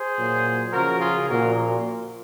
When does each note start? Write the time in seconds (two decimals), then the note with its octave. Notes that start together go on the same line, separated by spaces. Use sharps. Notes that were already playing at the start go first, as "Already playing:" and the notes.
Already playing: G#4 C5
0.16 A#2 F#3
0.72 C#3 F3 F#4 A#4
1.00 F4 G#4
1.28 A#2 F3 F#4 A#4